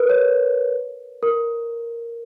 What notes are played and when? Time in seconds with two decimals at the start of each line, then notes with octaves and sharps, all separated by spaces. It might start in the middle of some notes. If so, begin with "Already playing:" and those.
Already playing: A#4 B4
0.09 C#5
1.23 A#4